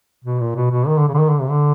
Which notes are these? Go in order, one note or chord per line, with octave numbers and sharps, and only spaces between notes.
B2
A#2
B2
B2
D#3
D3
C#3
D3
D#3
D3
C3
D3